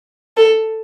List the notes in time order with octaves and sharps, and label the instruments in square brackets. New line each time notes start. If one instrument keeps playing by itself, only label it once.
[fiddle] A4